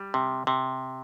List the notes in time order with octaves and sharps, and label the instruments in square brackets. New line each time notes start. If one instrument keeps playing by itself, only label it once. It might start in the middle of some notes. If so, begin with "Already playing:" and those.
Already playing: [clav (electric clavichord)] G3
C3
C3